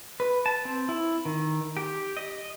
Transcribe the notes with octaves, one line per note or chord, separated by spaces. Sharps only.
B4
A5
C4
E4
D#3
G4
D#5